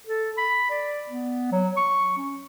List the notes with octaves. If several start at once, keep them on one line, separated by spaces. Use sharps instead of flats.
A4
B5
D5
B3
F#3
C#6
C#4